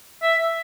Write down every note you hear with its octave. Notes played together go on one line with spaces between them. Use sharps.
E5